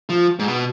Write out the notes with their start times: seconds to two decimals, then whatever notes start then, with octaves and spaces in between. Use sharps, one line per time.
0.09 F3
0.39 G#2
0.47 B2